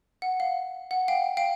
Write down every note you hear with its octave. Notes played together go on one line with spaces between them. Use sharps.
F#5
F5
F#5
F5 G5
F5 G5